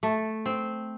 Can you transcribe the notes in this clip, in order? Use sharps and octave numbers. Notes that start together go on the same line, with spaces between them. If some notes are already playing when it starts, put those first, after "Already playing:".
A3
C4